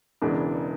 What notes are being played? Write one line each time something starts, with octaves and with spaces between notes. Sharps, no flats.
E1 E2 C#3 E3 G#3 D4